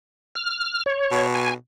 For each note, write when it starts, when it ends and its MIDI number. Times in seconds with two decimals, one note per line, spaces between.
0.35 0.83 89
0.86 1.27 73
1.11 1.53 47
1.35 1.54 80